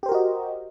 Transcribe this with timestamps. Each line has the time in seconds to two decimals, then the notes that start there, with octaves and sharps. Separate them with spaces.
0.03 G4
0.06 C5
0.09 A#4
0.12 F#4
0.14 D#5